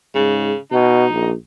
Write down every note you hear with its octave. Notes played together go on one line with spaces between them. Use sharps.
G#2 C#3
B2 D#4
A#1